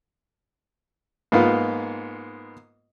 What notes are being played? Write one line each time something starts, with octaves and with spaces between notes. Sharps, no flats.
G#2 A#3 B3 F4